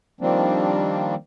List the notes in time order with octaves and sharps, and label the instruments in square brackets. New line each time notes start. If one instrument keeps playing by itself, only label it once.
[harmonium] D#3 F3 G3 A#3 C4 D4